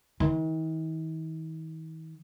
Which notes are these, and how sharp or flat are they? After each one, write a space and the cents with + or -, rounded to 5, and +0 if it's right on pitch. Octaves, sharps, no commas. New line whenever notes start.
D#3 +45